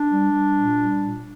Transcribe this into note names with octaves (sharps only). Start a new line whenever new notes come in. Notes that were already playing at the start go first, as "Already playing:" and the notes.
Already playing: D4
G3
G3
A#2
G3
A#2